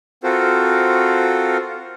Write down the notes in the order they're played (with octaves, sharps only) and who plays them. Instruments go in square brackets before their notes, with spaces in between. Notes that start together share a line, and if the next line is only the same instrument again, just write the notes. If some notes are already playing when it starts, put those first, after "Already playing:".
[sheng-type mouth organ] C4 F4 F#4 A4 A#4 C5